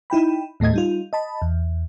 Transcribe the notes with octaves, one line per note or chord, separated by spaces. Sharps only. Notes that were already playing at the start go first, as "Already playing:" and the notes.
D#4 E4 G5 B5
D#2 A2 A3 D#5 G#6
G3 D#4 F4
D#5 A5 B5
E2